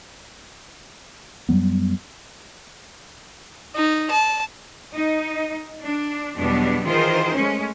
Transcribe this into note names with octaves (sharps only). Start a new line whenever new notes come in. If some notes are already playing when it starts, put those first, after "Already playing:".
F#2 F#3 G3 B3
D#4
A5
D#4
D4
E2 B2 F#3 G3 B3 D4
D#3 E3 F4 G#4 A#4 C5
G#3 A3 C#4